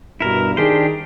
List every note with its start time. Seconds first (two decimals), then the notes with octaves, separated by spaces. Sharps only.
0.20 G2 B2 E4 A#4
0.57 D#3 D4 G4 G#4 C5